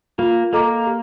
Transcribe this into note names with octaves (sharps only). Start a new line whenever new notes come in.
A#3 F4
A#3 A4 D#5 A#5 D6
G4